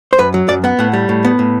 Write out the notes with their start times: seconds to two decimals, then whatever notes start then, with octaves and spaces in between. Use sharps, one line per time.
0.13 C5
0.18 F#2 B4
0.34 F#3
0.48 F#2 D5
0.64 B3 F#5
0.79 A2 F#5
0.93 G3
1.09 A2
1.25 B3
1.39 A2